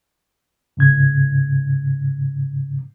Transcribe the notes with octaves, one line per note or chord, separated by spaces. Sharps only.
G#2 C#3 G#6